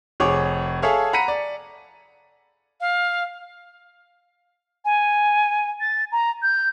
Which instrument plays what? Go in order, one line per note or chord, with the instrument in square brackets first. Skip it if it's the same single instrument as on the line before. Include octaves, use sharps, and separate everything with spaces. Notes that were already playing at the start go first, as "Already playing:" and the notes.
[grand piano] F1 G#4 C#5 D6
G#4 A4 C#5 E5 F5 G#5
F#5 A#5 B5 B6 C#7 D#7
D5
[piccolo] F5
G#5
A6
A#5
G6